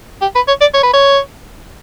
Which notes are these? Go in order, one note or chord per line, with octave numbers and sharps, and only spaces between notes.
G4
B4
C#5
D5
C#5
B4
C#5